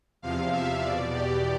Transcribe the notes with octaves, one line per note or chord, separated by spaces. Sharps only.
E2 C3 F3 F5
E5
E2 B2 D5
G4